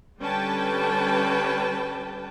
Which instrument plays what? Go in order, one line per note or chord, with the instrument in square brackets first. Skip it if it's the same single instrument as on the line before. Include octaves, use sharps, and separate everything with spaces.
[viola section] D3 G3 C#4 B4 G5 A5